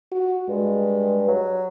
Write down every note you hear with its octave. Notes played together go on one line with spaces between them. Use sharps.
F#4
G2 G#3
F#3